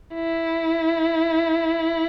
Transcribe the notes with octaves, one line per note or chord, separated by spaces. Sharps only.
E4